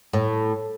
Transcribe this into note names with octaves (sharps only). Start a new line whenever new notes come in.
A2